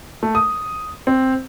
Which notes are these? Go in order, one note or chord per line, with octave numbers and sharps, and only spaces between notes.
A3
D#6
C4